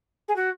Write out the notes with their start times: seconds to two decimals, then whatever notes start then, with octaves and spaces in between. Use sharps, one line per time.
0.28 G#4
0.36 F#4